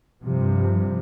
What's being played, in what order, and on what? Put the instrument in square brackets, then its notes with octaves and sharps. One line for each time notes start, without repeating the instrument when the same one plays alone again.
[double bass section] G2 C3 F3